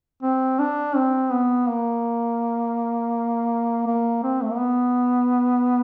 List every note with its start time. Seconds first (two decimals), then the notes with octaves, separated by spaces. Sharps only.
0.23 C4
0.59 D4
0.96 C4
1.32 B3
1.69 A#3
3.87 A#3
4.23 C4
4.42 A3
4.50 A#3
4.59 B3